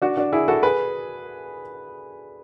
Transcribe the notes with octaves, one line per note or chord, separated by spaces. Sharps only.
D4 F#4
D4 F#4
E4 G#4
F#4 A4
G#4 B4